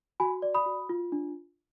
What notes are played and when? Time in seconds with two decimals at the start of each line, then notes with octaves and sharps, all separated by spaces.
0.20 F#4 G#5 B5
0.42 D5
0.54 B5 D#6
0.66 F#4
0.89 F4
1.12 D4